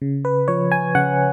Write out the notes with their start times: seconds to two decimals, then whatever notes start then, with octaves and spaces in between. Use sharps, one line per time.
0.02 C#3
0.25 B4
0.48 F3 C#5
0.72 G#5
0.95 C#3 F#5